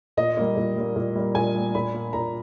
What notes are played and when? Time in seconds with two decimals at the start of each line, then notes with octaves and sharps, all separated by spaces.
0.17 A#2 D#5
0.37 G3 A#3
0.56 A#2
0.76 G3 A#3
0.96 A#2
1.15 G3 A#3
1.35 A#2 G#5
1.55 G3 A#3
1.75 A#2 B5
1.94 A#3
2.13 A#2 A#5